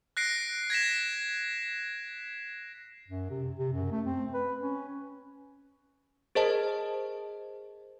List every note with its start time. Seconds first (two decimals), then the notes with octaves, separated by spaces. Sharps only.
0.17 F#6 A#6 C7 D7
0.70 G#6 A#6 B6 E7
3.08 F#2
3.31 C3
3.59 C3
3.73 F#2
3.92 A3
4.06 C4
4.34 B4
4.61 C#4
6.35 G#4 A#4 C5 D#5 A5